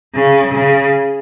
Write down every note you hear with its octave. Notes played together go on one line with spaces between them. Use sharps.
C#3
C#3